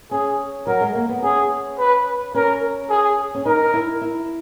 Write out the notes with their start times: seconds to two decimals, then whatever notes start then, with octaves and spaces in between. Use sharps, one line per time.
0.11 C#4 G#4
0.67 F#3 A#4
0.81 G#3
0.95 A#3
1.09 B3
1.23 C#4 G#4
1.78 B4
2.34 C#4 A#4
2.90 G#4
3.35 C#4
3.46 D#4 A#4
3.74 E4
4.01 E4